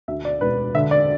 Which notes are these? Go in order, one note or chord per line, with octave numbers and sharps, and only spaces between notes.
D2 E5
D5
E1 B4
D3 E5
D5